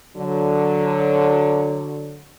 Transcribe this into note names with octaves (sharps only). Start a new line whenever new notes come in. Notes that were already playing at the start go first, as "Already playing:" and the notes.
D3 F#3